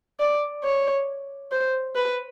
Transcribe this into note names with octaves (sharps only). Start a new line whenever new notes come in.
D5
C#5
C5
B4